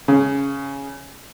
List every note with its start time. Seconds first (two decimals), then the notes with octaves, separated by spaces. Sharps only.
0.08 C#3